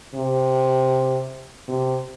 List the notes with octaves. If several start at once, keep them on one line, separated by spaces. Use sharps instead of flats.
C3
C3